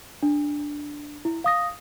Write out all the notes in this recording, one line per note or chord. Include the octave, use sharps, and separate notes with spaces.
D4
E4
F5 D#6 A#6